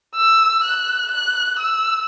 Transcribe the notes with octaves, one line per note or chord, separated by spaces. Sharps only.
E6
F#6
F#6
E6